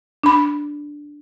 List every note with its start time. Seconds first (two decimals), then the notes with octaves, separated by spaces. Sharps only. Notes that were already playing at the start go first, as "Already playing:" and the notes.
0.23 D4 B5